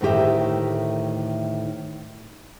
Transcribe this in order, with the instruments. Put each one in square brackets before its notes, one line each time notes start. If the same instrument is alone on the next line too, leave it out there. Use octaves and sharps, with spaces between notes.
[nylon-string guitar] D2 A2 D#3 G4 E5